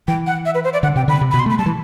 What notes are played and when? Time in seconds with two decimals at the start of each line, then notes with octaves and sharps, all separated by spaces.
0.08 E3 G5
0.27 F#5
0.45 E5
0.55 B4
0.64 C5
0.73 D5
0.83 D3 F#5
0.96 C3 G5
1.08 D3 B5
1.21 C3
1.31 B5
1.34 B2
1.39 C6
1.46 A3 B5
1.59 G3 A5
1.66 E3